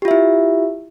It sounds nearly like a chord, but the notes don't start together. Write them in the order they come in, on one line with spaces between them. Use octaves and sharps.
G4 F4 E5 E4